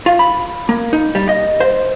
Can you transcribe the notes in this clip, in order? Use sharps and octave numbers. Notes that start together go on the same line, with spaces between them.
F4
B5
A#3
D#4
G3
D#5
C5